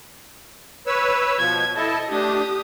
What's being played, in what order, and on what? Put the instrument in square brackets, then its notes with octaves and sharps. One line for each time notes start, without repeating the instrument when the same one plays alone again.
[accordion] B4 C#5 E6
[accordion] B2 F3 [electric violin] G#6
[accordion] E4 A4 A5 [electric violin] D#5
[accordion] A3 D4 [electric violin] G4 D#6